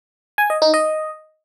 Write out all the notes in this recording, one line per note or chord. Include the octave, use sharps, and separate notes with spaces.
G#5
D#5
D#4
D#5